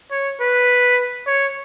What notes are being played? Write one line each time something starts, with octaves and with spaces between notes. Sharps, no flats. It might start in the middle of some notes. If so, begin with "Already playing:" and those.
C#5
B4
C#5